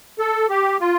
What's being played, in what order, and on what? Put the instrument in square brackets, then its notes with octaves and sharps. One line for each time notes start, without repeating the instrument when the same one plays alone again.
[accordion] A4
G4
F4